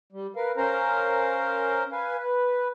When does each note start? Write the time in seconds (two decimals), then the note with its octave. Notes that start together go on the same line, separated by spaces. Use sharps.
0.13 G3
0.36 A#4 B4 F5
0.57 C#4 A#4 C5 F5 A#5
1.92 B4 F5 G#5
2.17 B4